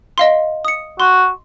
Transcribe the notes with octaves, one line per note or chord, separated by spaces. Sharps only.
D#5 F5 C6
D#6 C#7
F#4 C6